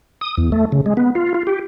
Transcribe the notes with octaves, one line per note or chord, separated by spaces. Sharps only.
D#6
E2
A3
C#3
G#3
B3
F4
F4
G4